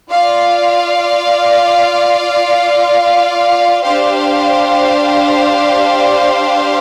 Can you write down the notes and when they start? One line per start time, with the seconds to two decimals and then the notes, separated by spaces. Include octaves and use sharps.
0.11 F4 D5 F5
3.83 D4 G4 C5 F5